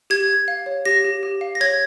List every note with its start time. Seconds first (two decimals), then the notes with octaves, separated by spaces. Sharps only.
0.10 G4 G#6
0.29 G4
0.48 F5
0.66 C#5
0.86 G4 A#6
1.04 G4
1.23 G4
1.41 F5
1.55 A#6
1.61 C#5 G#6